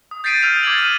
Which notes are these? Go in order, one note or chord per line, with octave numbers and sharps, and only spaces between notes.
D#6
G6 A6 B6 C7 D7 D#7
E6 F6 G6 C7 F7
D6 G#6 A6 F#7
F6 D#7